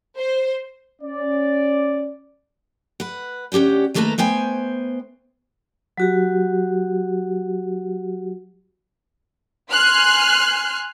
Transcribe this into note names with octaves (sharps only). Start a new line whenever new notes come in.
C5
C#4 D5
B4 F#5
D2 C#4 G4 F#5 G5
D#3 A3 A#3 A4 B4 A#5
A3 B3 C5 G5 G#5
F#3 F#4 G4
G#5 C6 F6 F#6 C7